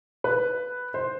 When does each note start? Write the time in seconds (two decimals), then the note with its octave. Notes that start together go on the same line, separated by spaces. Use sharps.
0.24 B4
0.94 C5